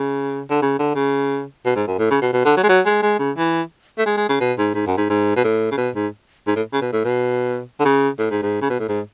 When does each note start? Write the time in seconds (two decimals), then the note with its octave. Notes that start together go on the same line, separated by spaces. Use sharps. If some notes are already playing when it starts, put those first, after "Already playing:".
Already playing: C#3
0.50 D3
0.62 C#3
0.79 D3
0.95 C#3
1.65 B2
1.76 G#2
1.87 F#2
1.99 A2
2.10 C#3
2.22 B2
2.33 B2
2.45 D3
2.57 F#3
2.64 G#3
2.69 F#3
2.86 G#3
3.02 G#3
3.19 C#3
3.38 E3
3.98 A3
4.06 G#3
4.17 G#3
4.29 C#3
4.40 B2
4.58 G#2
4.75 G#2
4.87 F#2
4.97 G#2
5.10 G#2
5.36 B2
5.44 A2
5.71 C#3
5.78 B2
5.95 G#2
6.47 G#2
6.56 A2
6.73 C#3
6.81 B2
6.93 A2
7.05 B2
7.80 D3
7.85 C#3
8.19 A2
8.30 G#2
8.42 G#2
8.62 C#3
8.70 B2
8.80 A2
8.89 G#2